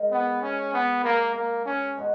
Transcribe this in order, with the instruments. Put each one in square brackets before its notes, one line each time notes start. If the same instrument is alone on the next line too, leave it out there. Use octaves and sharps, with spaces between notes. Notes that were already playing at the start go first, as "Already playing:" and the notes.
Already playing: [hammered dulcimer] G#3 D#4 A#4
[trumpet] B3
C#4
B3
A#3
A#3
C#4
[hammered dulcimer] B2 G#3 D#4 F#4